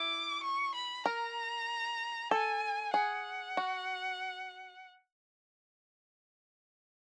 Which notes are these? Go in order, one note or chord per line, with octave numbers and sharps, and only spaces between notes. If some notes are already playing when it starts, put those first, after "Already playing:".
Already playing: E4 D6
C#6
B5
A#4 A#5
A4 G#5
G#4 F#5
F#4